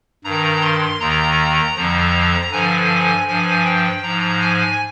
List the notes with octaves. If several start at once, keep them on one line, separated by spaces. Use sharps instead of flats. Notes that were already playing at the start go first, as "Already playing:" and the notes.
G2 D#3 A#5
C6
D#2 D#3 A#5
F2 D3 F3
G2 D3 F3 G#5
G2 F3 G#5
G5
G#2 F3 A#5
G#5